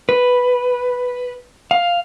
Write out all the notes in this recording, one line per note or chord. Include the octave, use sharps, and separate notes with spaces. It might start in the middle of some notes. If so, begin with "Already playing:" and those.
B4
F5